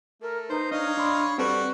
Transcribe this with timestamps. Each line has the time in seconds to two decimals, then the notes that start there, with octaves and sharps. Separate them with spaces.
0.22 A3 A#4
0.50 D#4 B4 C5
0.71 D4 C#5 D#5 F5
0.97 D4 B5 C6
1.38 G3 C4 F#4 A4 B4 C#6